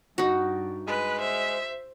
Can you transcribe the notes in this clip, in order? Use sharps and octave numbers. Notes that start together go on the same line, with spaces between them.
G2 D#4 F#4
G#3 B4
C5 E5